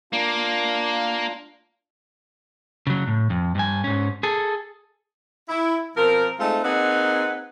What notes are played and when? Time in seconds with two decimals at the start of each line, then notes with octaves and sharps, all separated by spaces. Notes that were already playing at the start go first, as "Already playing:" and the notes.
0.13 A#3 D4 F4
2.87 C#3 F#3
3.07 A2
3.30 F2
3.55 G2 G#5
3.84 G#2 C#4
4.23 G#4 A4
5.49 E4
5.97 B2 F3 C4 A#4
6.40 G#3 A3 C4 D#4 F4 A4
6.64 A#3 C4 D#4 G#4 B4 F#5